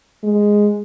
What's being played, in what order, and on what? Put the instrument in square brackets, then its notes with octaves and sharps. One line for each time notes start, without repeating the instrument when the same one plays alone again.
[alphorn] G#3